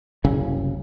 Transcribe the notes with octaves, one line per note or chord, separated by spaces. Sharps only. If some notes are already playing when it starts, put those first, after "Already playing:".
F#1 C2 C#3